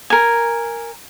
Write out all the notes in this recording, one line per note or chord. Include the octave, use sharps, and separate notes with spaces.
A#4 G#5